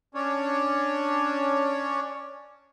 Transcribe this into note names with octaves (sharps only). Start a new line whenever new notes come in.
C#4 D4 C#5